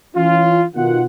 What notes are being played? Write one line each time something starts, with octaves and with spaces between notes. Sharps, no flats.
E3 C#4 F4
B2 D#3 F4 F#5